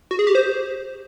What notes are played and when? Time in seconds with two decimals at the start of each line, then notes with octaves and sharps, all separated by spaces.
0.11 F#4
0.19 G#4
0.27 G4
0.35 C5